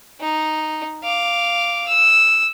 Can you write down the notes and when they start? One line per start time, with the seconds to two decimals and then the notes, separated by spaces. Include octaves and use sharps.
0.21 D#4
1.04 F5 D6
1.89 E6